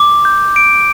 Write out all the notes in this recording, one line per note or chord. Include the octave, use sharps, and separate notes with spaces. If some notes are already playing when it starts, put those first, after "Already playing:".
Already playing: D6
G6
D7